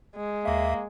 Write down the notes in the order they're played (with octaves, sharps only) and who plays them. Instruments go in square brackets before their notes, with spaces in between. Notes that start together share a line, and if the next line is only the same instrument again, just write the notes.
[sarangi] G#3
[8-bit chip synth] D#2 E5 [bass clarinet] A#3